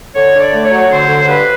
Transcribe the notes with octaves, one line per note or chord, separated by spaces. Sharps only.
D3 C#5
D3
D5
A3
C#5
F#3
D3 C5
D3
G2 B4